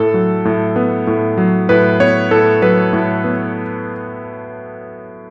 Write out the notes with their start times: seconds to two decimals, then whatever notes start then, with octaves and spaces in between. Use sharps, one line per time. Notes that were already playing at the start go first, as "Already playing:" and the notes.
Already playing: A2 A4
0.14 F#3
0.45 A2
0.76 B3
1.07 A2
1.38 F#3
1.69 A2 B4
2.00 B3 C#5
2.31 A2 A4
2.62 F#3 B4
2.93 A2
3.24 B3